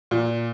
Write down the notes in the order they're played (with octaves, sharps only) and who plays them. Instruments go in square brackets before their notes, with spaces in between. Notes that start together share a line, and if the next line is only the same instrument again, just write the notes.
[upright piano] A#2